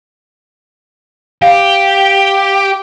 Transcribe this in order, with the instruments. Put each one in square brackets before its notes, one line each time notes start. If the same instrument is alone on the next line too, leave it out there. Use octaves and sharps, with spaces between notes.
[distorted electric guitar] G4 [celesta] F5